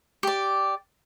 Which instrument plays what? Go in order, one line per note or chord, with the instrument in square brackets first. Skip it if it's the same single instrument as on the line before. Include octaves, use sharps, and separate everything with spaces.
[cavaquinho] G4 D5